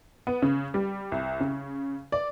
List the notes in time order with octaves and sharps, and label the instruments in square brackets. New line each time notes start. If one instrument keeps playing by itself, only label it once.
[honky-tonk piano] B3
C#3
G3
C2
C#3
D5